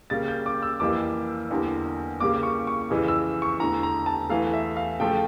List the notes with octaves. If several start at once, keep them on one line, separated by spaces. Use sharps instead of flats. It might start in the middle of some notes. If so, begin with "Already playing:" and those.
C#3 G3 A#3 A6
G6
D6
E6
F2 E3 G3 A#3 D6
E2 D3 G3 A#3
C#3 G3 A#3 D6
C#6
C#6
F2 C#3 E3
E6
C#6
E2 D3 A3 A#5
A#5
A5
E2 E3 A3 F5
E5
F5
C#3 F3 A3 G5